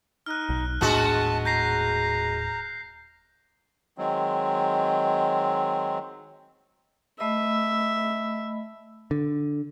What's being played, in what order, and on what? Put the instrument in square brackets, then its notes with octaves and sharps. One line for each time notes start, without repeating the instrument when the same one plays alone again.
[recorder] D#4 [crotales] F6 F#6
[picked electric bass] B1
[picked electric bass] D#1 A2 D4 [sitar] G#3 B3 F#4 [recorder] A5
[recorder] A#5 [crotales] G6 A#6 C7
[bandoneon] D#3 F#3 G#3 C4
[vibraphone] A3 D#5 B5 [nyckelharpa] E5
[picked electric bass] D3